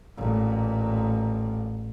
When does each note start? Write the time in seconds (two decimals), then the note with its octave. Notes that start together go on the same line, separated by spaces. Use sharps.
0.17 A1 A#2